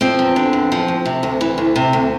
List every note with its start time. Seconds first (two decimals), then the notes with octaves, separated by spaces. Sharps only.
0.01 F3 C4
0.19 E2
0.36 D3
0.53 E2
0.72 F3
0.88 D2
1.05 C3
1.23 D2
1.41 E3
1.58 D2
1.76 C3
1.93 D2